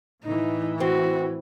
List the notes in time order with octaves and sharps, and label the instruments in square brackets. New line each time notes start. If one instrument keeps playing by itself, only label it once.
[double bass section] A2 E3 [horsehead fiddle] D#4
[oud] C4 [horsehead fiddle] F#4